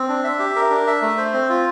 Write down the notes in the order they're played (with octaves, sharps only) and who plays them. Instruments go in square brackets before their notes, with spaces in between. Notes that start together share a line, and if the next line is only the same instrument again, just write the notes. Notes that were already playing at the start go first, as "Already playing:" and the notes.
Already playing: [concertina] C4
D4
E5
G4
A#4
D4
E5
A3
C5
C4
F4